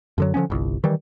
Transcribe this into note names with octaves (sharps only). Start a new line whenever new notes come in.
F#2 D3 F#3
D3 F3 B3 C#4
G1 C2
D#3 E3 G3